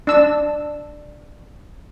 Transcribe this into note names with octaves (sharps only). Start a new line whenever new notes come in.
D4 E6